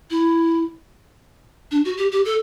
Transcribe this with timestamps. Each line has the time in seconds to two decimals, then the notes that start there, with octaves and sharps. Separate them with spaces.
0.10 E4
1.71 D4
1.85 F#4
1.97 G4
2.12 G4
2.25 A4